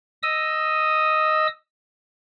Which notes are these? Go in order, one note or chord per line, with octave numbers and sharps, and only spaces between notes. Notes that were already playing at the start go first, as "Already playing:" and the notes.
D#5 D#6 E6